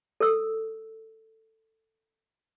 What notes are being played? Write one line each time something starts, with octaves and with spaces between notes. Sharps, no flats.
A4 E6